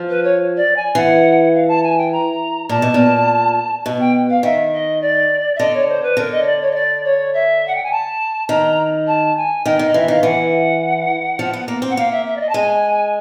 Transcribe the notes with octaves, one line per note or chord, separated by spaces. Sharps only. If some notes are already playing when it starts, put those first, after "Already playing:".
Already playing: F3
B4
C#5
D5
G#5
E3 F#5
F5
A5
G#5
G5
A#5
A#2 A5
B2
A#2
B2
G5
F5
D#3 E5
D#5
D5
E5
D3 D#5
C#5
C5
B4
D3 A#4
D#5
C#5
D5
C#5
D#5
D5
C#5
E5
F#5
G5
G#5
A5
D#3 A#5
A5
G#5
D#3 G5
D#3
D#5
E3 E5
D#3 F5
E3 F#5
F3
B3
A#3
C4
F#5
A#3 F5
E5
E5
D5
D#5
A5
G#3 G#5